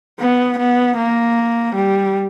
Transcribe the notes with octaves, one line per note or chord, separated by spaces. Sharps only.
B3
B3
A#3
G3